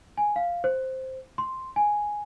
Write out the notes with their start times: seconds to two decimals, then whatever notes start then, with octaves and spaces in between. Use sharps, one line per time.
0.18 G#5
0.36 F5
0.64 C5
1.38 C6
1.76 G#5